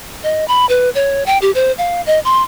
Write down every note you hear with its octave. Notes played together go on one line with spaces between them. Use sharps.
D#5
B5
B4
C#5
G5
G4
C5
F5
D#5
C6